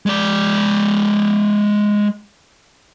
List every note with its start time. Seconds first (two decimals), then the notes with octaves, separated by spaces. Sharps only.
0.06 G#3 D5